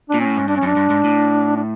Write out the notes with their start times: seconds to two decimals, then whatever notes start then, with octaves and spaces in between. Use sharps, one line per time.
0.10 A#2 D4
0.20 C#4
0.25 A2
0.37 G#2
0.48 G2 D4
0.57 C#4
0.62 F#2 D4
0.76 G2
0.90 G#2
1.04 A2
1.57 D4